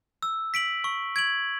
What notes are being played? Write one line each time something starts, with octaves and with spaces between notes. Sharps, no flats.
E6
B6 D7 F#7
C#6
G#6 D7 F#7